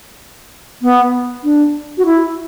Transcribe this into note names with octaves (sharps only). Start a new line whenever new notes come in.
B3
D4
F#4
E4